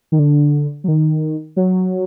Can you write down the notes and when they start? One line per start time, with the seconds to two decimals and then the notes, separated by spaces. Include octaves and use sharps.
0.12 D#3
0.19 D3
0.84 F#3
0.88 D#3
1.56 F#3